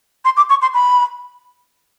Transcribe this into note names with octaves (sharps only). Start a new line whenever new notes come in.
C6
D6
C#6
C6
B5